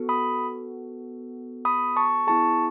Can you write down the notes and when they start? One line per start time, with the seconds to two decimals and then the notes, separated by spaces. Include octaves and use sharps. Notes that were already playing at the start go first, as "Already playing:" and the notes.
Already playing: B3 F#4 A4
0.09 B5 D#6
1.65 B5 D#6
1.96 A5 C#6
2.27 B3 E4 G#4 A5 C#6